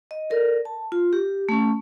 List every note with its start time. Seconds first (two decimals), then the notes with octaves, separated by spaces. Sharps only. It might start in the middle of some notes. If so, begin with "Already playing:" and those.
0.11 D#5
0.30 A4 A#4 D5
0.65 A5
0.92 F4
1.13 G4
1.49 A3 C#4